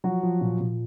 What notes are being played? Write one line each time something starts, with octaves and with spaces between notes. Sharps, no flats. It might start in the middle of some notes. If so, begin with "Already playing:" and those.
F3 F#3 F#4
F3
A#2
A#2